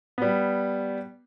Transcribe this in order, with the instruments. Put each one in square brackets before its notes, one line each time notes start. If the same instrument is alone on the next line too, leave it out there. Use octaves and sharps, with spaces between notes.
[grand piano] G3 B3